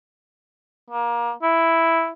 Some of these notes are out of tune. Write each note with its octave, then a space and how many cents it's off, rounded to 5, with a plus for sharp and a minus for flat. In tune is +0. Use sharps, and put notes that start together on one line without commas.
A#3 +25
E4 +0